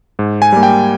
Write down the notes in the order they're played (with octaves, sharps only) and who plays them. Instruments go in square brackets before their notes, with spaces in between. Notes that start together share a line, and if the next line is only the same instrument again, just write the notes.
[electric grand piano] G#2
G#5
G3 A#3
G5